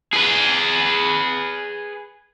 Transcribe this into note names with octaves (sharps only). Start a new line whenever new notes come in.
G#4 B4